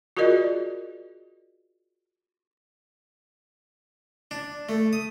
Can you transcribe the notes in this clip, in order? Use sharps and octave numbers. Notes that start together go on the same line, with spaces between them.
F4 F#4 G#4 A#4 D5 D#5
D4
A3
D#6